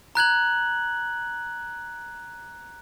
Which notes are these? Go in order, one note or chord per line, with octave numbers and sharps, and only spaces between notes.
A#5 F#6 G#6 F#7